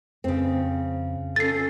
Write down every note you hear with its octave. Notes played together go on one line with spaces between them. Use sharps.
F2 C#3 C4
C#4 A4 A6 C7